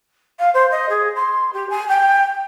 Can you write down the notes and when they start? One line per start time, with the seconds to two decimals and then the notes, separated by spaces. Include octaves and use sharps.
0.39 F5
0.54 C5
0.71 D#5
0.89 G#4
1.16 C6
1.53 G4
1.70 G#5
1.89 G5